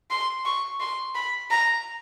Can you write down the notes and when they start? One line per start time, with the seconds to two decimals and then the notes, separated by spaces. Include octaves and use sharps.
0.11 C6
0.45 C#6
0.80 C6
1.15 B5
1.51 A#5